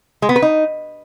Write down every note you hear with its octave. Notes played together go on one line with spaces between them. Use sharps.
G#3
B3
B4
D#4